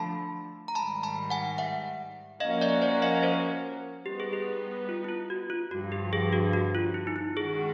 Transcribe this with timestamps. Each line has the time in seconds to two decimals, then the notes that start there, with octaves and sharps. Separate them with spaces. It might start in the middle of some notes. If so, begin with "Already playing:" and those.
Already playing: D3 F3 A3 A5 B5
0.68 A#5
0.75 G#2 D#3 G3 A5 B5
1.03 A5 B5
1.30 F#5 G#5
1.58 E5 F#5
2.40 F3 A#3 C#4 F#4 D#5 F5
2.61 D5 E5
2.82 C5 D5
3.02 D#5 F5
3.23 A#4 C5
4.06 G3 B3 D#4 G4
4.20 G#4
4.33 G4
4.89 F4
5.04 E4
5.09 F4
5.30 F#4
5.50 F4
5.71 G2 D3 F3 F#4
5.92 G4
6.13 G#4
6.33 F#4
6.53 F#4
6.75 F4
6.94 E4
7.07 D#4
7.16 E4
7.36 D#3 G#3 C#4 F#4 G#4 A4